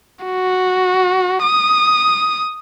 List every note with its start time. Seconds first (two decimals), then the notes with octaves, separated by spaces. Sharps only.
0.25 F#4
1.43 D#6